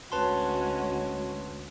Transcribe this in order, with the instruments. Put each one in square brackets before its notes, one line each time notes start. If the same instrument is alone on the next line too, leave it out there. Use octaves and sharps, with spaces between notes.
[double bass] D2 [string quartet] G#3 C#4 F#4 [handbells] B4 A5 C6